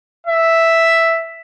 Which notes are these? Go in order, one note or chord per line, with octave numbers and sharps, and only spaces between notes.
E5